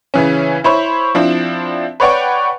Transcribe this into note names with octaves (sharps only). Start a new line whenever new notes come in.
C#3 E3 C#4
E4 C5 C#5 B5 C#6
F3 C4 D4 E4
B4 C#5 D5 F#5 G5 C#6